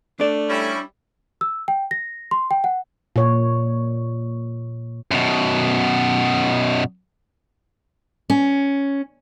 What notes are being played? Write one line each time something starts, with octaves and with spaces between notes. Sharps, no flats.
A3 D4 D5
G3 C#4 E4
E6
G5
A#6
C6
G5
F#5
A#2 C#5
F#2 B2
C#4